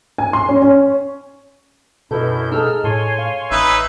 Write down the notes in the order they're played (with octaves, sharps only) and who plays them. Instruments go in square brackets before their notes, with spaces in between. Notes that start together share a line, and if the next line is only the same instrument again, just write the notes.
[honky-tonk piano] G#5
C6
C#4
C#4
[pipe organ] F#2 E4 G6 [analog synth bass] B2 [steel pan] A4 B4 D#5
[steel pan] D#4 G#4 A4 [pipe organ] E6 F6
[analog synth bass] A2 [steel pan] A4 A5 [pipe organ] C#5 G#5 C6
[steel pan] F5
[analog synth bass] A1 [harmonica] D#4 B4 E5